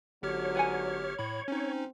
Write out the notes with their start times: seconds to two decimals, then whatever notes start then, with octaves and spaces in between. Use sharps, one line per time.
0.23 G1 G#2 D3 F#3 G4 C#5 F6
0.55 B4 F#5 G#5
1.19 A2 B5
1.48 C4 C#4 D#4